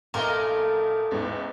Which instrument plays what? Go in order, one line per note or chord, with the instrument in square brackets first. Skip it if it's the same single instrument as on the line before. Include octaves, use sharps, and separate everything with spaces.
[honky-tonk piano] B1 A#2 C6 [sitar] A3 D#5 [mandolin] A#4
[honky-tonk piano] A1 E2 G#2